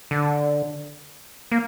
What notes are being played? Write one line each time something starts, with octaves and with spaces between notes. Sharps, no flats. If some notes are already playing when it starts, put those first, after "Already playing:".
D3
A#3